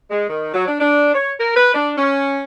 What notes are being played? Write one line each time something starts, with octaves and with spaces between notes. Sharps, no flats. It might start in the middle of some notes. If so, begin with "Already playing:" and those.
G#3
D#3
F#3
D4
D4
C#5
A#4
B4
D4
C#4